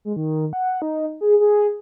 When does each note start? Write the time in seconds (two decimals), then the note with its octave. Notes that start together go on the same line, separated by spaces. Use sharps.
0.05 G#3
0.16 D#3
0.53 F#5
0.82 D#4
1.21 G#4
1.40 G#4